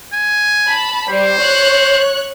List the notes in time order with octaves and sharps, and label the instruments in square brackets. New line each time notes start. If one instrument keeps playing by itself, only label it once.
[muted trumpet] G#5
[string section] A5 B5
[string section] G3 [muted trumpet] C5
[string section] C#5 F#6